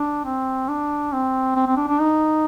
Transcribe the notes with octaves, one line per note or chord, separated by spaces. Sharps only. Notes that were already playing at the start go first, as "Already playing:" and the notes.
Already playing: D4
C4
D4
C4
C4
C4
D4
D4
D#4